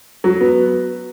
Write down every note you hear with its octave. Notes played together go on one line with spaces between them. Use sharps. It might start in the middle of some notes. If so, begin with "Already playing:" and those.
F#3
B3